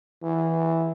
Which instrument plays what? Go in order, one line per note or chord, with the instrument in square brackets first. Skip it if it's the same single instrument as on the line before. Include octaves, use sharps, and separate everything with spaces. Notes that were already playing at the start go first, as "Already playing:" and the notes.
[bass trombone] E3